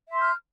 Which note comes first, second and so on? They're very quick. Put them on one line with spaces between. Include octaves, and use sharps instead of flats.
E5 C6 G6 F6